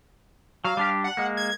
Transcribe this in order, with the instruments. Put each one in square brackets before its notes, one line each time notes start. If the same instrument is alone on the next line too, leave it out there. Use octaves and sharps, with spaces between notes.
[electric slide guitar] F#3 [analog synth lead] F5
[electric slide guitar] G3 D4 G4
[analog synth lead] F#5
[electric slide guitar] G#3 A#3
[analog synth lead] G#6